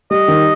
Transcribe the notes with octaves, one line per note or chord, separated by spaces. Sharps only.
G3 D#5
D#3